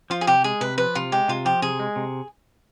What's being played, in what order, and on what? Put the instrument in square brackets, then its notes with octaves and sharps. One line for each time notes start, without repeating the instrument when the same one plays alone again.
[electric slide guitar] F3 [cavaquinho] F4
[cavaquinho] G#4
[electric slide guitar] C3 [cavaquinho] G4
[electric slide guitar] G#3 [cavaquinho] G#4
[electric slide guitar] C3 [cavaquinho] B4
[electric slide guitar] F3 [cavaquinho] B4
[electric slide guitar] C3 [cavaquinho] F4
[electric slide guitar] G#3 [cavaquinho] G4
[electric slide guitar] C3 [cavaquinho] F4
[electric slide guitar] F3 [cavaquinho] G4
[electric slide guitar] C3 [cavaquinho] G#4
[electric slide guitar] G#3
C3